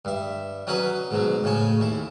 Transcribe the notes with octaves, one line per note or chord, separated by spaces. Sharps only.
G2 E5
F#3 C#4 D#4 F#4 B4
G#2 B2 F#3
A2 C#3 C#5 G#5
D#2 E4